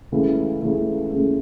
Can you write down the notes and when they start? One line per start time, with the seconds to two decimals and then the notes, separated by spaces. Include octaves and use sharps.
0.12 C#2 C#3 E3 A3
0.62 C#2 C#3 E3 A3
1.12 C#2 C#3 E3 A3